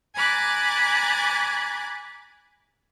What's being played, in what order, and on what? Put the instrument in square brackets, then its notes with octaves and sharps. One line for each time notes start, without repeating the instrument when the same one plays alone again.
[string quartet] G#5 A#5 B5 D6 F#6 A6